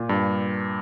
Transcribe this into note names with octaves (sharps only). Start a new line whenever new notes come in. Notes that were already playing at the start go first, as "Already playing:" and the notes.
Already playing: A#2
G2